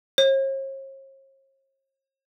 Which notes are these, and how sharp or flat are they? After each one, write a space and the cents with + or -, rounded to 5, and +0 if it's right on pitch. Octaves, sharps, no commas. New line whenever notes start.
C#5 -45